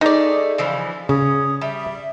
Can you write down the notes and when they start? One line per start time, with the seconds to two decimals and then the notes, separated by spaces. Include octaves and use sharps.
0.01 A3 D#4 G#4 D5
0.58 C#3 E3 F3
1.09 C#3 C#4 D#6
1.61 G3 E5